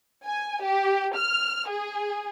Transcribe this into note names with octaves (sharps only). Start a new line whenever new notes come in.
G#5
G4
F6
G#4